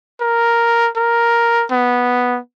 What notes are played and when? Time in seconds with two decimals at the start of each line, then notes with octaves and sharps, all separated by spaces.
0.21 A#4
0.97 A#4
1.71 B3